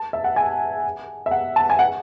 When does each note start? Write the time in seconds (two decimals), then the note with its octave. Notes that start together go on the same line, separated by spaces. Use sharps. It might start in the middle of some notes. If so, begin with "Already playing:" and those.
Already playing: A5
0.13 E5
0.24 F#5
0.36 G#5
1.26 E5
1.31 F#5
1.56 A5
1.70 G#5
1.79 F#5